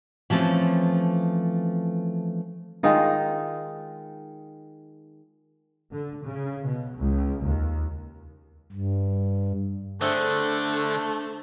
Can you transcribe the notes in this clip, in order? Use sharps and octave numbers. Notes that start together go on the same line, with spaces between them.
E3 F3 G3 A3 C4 C#4
D#3 G#3 D#4 F4
D3
C#3
B2
C#2
D#2
G2
D3 A3 C4 D4 G#4 E5